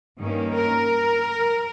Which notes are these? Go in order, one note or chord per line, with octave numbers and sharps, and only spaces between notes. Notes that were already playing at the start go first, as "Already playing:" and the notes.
G2 D#3 A#3 C#4
A#4